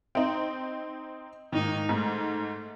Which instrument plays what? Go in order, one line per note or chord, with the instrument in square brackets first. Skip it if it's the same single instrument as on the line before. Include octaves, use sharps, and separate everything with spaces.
[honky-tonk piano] C4 D#4
[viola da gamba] G#2 A#3 D#4 [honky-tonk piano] D#3
[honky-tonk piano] G#2 [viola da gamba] A3